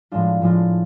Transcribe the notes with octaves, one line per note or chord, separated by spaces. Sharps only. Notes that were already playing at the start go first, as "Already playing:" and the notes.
A2 F3 G#3 D4 F4
A2 F3 G#3 D4 F4